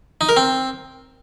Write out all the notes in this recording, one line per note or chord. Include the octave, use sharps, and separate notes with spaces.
D#4
A#4
C4